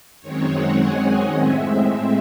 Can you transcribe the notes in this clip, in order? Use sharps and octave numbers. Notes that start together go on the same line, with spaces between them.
F#2 D#3 G#3 C4 C#5
F#5
G#5
D#5
A2 G#3 C4 E5